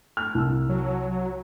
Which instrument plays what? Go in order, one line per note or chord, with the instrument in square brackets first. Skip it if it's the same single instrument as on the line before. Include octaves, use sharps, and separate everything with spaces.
[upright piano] F6
C2 E6
[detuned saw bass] F#3